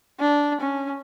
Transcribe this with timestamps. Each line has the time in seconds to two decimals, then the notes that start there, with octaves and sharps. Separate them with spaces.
0.20 D4
0.61 C#4